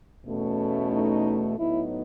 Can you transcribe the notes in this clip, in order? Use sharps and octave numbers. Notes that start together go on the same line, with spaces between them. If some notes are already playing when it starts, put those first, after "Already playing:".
E2 B2 A3 C#4
D#4
A2 F#3 B3 D#4 E4